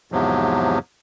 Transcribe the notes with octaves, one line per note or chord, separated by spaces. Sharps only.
E2 G#2 C3 F3 F#3